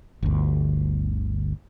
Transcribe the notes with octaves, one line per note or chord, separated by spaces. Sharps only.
G1 D2